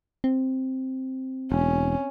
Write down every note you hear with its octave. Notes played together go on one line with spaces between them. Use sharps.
C4
E1 C#4